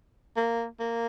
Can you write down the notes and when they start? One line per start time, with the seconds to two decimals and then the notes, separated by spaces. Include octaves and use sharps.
0.36 A#3
0.80 A#3